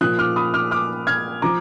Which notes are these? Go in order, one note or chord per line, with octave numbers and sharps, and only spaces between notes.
A#2 F3 D#6 F#6
D6 F6
B5 D#6
D6 F6
D6 F6
F6 G#6
F3 A#5 D6